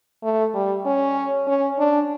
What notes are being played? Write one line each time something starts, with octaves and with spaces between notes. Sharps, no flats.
A3
G3
C#4
C#4
D4